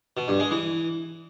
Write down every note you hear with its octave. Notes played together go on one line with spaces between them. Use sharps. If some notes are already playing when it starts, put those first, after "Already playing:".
B2
G2
G#3
E3